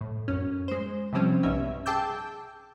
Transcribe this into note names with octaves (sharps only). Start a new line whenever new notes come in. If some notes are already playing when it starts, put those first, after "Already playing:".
A2
F#2 C#4
G#3 C5
C3 F3 G3 C4 C#4
B1 G2 B2 C#4 E5
G#4 G5 A5 D6 E6 G6